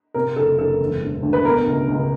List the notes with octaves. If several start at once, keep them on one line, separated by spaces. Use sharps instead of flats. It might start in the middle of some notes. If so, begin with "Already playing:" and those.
C3 A#4
F#1 A4
F#1 A4
E1
E1
D2
B4
B2 A#4
C#2
C#2